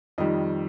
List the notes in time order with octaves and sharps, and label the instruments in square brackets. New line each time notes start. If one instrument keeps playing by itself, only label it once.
[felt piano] F2 D#3 G3 D#5